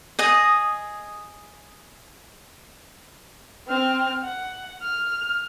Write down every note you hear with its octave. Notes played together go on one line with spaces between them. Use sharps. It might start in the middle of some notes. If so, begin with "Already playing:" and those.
G#4 D#5
C4 F6
F#5
F6